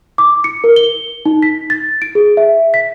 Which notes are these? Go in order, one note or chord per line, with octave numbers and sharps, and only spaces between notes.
D6
C#7
A#4
G7
D#4
B6
A6
D7
G#4
E5
B6